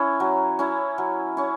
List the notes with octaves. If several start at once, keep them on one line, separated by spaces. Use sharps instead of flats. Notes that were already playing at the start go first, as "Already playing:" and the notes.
Already playing: C#4 E4
F#3
C#4 E4
F#3
C#4 E4